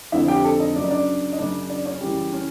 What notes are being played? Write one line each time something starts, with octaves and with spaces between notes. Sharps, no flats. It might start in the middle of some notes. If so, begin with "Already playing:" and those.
F2 D3 F3 E4 E5
G4 G5
A4 A5
D#4 D#5
F#2 C#3 F#3 D5
D#5
D4 D5
D#5
F#2 C#3 F#3 D4 D5
D4 D5
C#4 C#5
F#2 C#3 E3 G3 G4
C#4